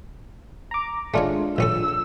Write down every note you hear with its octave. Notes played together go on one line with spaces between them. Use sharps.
A#5 D6
G#3 A3 D4 D#4 F4 C#5
A#1 C#4 A4 E6